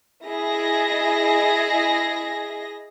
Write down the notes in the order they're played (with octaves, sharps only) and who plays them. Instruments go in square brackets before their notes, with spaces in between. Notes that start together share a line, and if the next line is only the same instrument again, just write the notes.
[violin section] E4 G#4 D#5 A#6